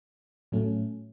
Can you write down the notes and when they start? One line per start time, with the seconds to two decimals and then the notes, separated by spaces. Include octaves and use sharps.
0.52 A2 F#3 A3 C#4